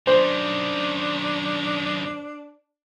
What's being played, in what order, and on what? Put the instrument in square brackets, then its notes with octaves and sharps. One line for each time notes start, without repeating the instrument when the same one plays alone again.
[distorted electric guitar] F#2 D#3 [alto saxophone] D4 [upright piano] C5